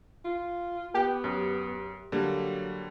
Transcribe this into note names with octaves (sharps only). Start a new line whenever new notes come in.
F4
B3 G4
F#2
D3 F#3 G3 A#3